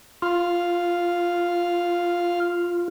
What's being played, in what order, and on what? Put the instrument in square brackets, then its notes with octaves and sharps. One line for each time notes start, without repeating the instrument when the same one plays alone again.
[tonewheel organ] F4 [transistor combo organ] F5